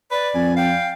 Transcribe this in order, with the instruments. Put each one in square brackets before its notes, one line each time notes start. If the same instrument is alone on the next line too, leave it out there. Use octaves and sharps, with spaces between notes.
[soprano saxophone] B4 [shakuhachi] D5
[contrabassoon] F2 [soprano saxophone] G#5
[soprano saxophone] F5 [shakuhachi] G5